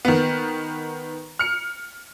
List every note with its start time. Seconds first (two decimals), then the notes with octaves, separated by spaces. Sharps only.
0.05 D#3 B3
1.39 F6 C#7